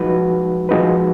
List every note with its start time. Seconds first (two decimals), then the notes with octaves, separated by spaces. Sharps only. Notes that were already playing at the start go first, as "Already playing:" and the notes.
Already playing: F3 G#3 D#4 F#4 B4
0.69 F3 G#3 D#4 F#4 B4